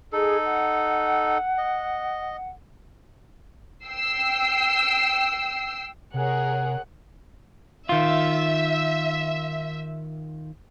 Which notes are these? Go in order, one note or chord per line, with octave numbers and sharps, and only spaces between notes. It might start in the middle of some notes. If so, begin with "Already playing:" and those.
D#4 G#4 A4
F#5
D#5
G5 E6 C7
C3 G#4 A#4 C#5 F#5
D#3 F4 E5